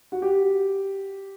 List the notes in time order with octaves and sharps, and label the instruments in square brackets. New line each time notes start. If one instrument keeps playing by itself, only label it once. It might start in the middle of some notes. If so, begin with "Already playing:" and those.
[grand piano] F#4
G4